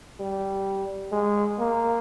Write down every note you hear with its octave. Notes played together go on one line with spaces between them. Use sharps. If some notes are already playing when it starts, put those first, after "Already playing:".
G3
G#3
A#3